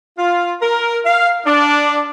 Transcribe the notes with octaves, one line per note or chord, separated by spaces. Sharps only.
F4
A#4
F5
D4